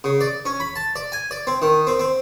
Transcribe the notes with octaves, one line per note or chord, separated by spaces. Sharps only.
C#3
D5
C#4
B5
A5
D5
G#5
D5
C4
D#3
C4
C4